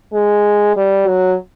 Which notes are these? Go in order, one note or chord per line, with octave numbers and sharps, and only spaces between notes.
G#3
G3
F#3